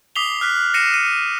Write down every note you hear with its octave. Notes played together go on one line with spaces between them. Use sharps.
D6 D#6 B6 C7 F7 G7
F6 F#6 B6
F6 A#6 C7 C#7 D#7 E7
A#6 C#7 D#7